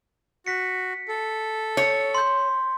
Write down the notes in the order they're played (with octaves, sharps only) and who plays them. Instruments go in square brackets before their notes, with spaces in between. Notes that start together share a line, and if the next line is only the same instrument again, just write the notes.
[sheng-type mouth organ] F#4 [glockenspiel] B6 C#7
[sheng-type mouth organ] A4
[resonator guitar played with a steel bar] C#5
[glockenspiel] C6 G6